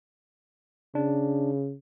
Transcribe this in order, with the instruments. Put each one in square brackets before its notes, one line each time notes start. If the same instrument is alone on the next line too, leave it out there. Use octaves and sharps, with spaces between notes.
[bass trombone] C#3 [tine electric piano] D4